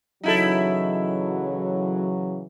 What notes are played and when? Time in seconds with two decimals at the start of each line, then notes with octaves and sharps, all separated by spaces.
0.23 C#3 E3 F#3 D#4 E4 A4